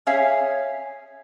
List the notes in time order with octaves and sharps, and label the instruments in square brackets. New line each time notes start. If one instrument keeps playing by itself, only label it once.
[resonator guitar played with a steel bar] C#4 G#4 C#5 E5 F5